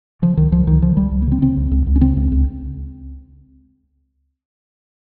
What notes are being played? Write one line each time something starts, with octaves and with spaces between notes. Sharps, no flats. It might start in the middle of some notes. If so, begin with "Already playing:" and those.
C#3 F3
C#2 D#3
C#2 F3
C#2 D#3
C#3 F3
C#2 G3
C#2
A#3
C#3 C4
C#3 C4
C#2
C#2
C#2
C#4
C#3 C4
C#2
C#2